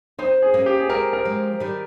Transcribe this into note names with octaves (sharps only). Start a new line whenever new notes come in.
C4 D#4 C5
G#4
A#3 C#4
G4
G#4
G#3 C4 A#4
A#4
F3 G#3
D#3 G3